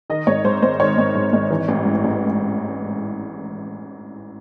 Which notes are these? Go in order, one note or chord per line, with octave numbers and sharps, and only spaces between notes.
D#3 D#5
G#1 C#5
G#2 C5
G#1 C5
D#3 C#5
G#1
G#2
G#1
E3
A1
G#2
A1